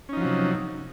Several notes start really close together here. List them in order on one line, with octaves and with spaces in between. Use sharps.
C#4 D#4 F3 F#3 C3